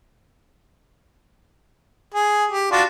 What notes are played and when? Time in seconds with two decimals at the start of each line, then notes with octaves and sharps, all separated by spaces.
2.14 G#4
2.50 G4
2.72 D4 F4 F#4